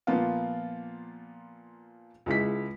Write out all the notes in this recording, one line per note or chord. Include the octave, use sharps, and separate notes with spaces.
A#2 F3 A#3 B3 F4
C#2 G#3 E4 B6